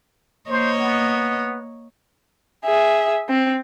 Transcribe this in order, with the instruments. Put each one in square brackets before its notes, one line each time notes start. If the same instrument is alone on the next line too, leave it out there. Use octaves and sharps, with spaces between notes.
[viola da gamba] A#3 C#5 D#5 [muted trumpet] C5
[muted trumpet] B3
[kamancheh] G#4 E5
C4